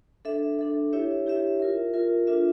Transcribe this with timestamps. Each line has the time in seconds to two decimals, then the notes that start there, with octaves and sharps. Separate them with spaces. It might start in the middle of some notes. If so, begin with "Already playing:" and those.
0.25 D4 A4 E5
0.59 D4 A4 E5
0.93 E4 G4 C#5 E5
1.26 E4 G4 C#5 E5
1.60 F4 A#4 E5
1.94 F4 A#4 E5
2.27 D4 F4 A4 E5